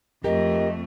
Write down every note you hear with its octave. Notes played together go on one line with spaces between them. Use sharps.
F2 A3 G4 A#4 D#5